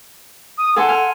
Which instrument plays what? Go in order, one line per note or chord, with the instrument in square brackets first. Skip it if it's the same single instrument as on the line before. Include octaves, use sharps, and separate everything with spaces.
[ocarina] D#6
[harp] A4 G#5 C6 [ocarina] F#5
[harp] G#5 F6